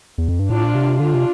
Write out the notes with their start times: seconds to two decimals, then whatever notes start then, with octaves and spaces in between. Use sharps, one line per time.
0.18 E2
0.28 F2
0.39 G2
0.50 A2 D4 F4
0.64 A#2
0.75 C3
1.00 D3 D4 F4
1.14 C3